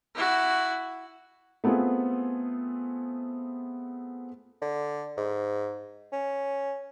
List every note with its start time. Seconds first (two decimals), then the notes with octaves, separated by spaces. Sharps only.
0.15 E4 F#4
1.64 A3 B3 C4 F4 G#4
4.62 D3
5.18 G#2
6.12 C#4